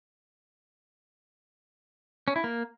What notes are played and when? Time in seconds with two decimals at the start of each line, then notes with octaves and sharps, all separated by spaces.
2.28 C#4
2.36 E4
2.44 A#3